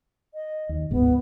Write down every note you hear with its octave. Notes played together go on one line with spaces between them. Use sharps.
D#5
D#2
G1 D2 G#2 B3